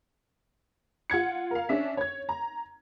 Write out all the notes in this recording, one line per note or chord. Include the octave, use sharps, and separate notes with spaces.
F4 F#5 G#6 C#7
A#4 F5
C#4 D4 E5
C#5 G#6
A#5